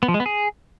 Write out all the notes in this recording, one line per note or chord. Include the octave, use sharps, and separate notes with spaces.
B3
F3
G#3
B3
G#4